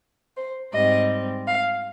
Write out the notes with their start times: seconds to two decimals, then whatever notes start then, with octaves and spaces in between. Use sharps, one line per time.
0.37 C5
0.73 G#2 G3 C4 D#5
1.47 F5